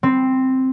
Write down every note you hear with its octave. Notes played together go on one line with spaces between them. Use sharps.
C4